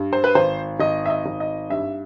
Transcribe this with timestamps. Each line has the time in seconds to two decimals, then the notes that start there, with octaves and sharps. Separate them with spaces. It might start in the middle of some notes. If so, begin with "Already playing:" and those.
Already playing: G2
0.13 C5
0.24 B4
0.35 G#1 C5
0.80 G#1 D#5
1.06 E5
1.10 D#5
1.26 G#1
1.40 D#5
1.70 G2 E5